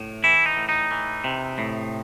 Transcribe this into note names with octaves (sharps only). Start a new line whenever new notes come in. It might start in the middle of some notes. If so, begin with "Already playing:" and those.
Already playing: A2
E3 E4
D#4
A2
D#4
E3
C3
A2